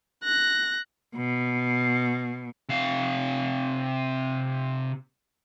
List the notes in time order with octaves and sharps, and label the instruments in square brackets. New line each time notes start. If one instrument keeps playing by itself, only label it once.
[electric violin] F#6 A#6
[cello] B2
[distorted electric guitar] C3 F5